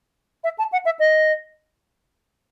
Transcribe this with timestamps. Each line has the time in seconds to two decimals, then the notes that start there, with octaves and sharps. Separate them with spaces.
0.44 E5
0.59 A5
0.72 F#5
0.85 E5
0.99 D#5